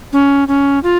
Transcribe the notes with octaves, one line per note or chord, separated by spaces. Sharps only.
C#4
C#4
F4